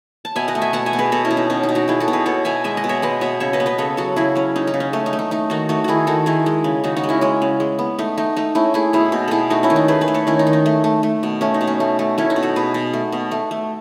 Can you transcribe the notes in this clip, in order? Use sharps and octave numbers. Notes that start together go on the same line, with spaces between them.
A5
B2 E5 G#5
D#5 F#5
A3
E5 G#5
B2 F#5 A5
E5 G#5
B2
G#4 B4
B2 F#4 A4
C#4 E4
B2
D#4
B2 C#4
D#4
B2
D#4 F#4
B3 E4 G#4
F#4 A4
B2
G#4 B4
B3 A4 C#5
B2 E5 G#5
G#3 E5 G#5
D#5 F#5
B2
C#5 E5
G#3 B4 D#5
B2 C#5 E5
C#3 C#5 E5
B4 D#5
B3
B4 D#5
C#3 A4 C#5
F#3 F#4 A4
C#3 E4 G#4
F#3 C#4
C#3 D#4
D#4
C#3
C#4
A3 C#4
D#4
A3
D#4
A3 D#4
D#3 D#4 F#4
A3 D#4 F#4
D#3 E4 F#4 G#4
D#3 F#4 A4
D#3 E4 G#4
G#3
C#3
C#3 D#4 F#4
D#4 F#4
G#3
C#4 E4
G#3 C#4
C#3
G#3
B3
A3 D#4
A3 D#4
A3 D#4
A3 C#4 E4
A3 E4 G#4
B2 E4 G#4
B2 D#4
B2 E4 G#4 A4
A3 D#4 F#4
C#4 E4
D#3
D#4
A3 G#4 B4
G#4 B4
A3
A4 C#5
D#3 C#4 E4
D#4
D#3
D#4
A3
A3
A3
B2
A3 C#4
D#4
B2
C#4
A3
A3
A3 C#4 E4
D#4
B2
F#4 A4
B2 G#4 B4
B2
A3
B2
A3
A3